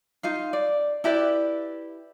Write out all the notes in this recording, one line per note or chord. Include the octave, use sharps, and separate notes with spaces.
D#4 F4 F5
D5
E4 G4 B4 D5